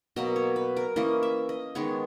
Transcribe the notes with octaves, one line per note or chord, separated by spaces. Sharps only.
B2 F#3 A#3 D#5
C#5
B4
A#4
E3 A#3 C#4 D#5
E5
D#5
D#3 G#3 B3 C#5